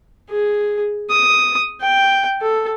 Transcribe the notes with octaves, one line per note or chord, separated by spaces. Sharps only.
G#4
D#6
G5
A4